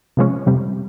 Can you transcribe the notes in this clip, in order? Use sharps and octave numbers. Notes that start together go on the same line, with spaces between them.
C3 F3 G#3 C#4
F2 C3 G3